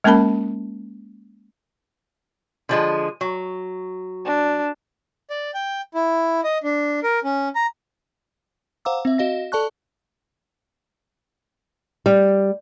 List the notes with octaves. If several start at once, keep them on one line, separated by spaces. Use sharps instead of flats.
G#3 A#3 C#4 A#4 A5 B5
D3 F3 G#3
F#3
D4
D5
G5
E4
D#5
D4
A#4
C#4
A#5
C5 F5 F#5 A#5 D6 E6
C4 E5
F#4 D#5 F5 A#6
A4 D5 A5 C#6 F#6
G3